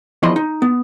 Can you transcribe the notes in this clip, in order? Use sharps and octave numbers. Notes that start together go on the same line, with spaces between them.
E2 E3 F3 D#5 B5 C6
D#4
B3